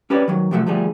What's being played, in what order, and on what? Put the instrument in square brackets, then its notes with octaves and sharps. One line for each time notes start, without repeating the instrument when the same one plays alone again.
[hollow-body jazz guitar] C#4 G4 B4 C#5 D5
D#3 F#3
C3 F3 F#3 G#3 A3
D3 F3 G3 A3 G#4